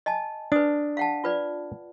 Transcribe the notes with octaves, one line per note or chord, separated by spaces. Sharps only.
D#5 G#5 A5
D4 B4 D#6
F5 F#5 A5
F4 B4 D5